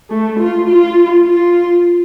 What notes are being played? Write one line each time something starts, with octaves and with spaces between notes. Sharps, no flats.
A3
F4
F4
F4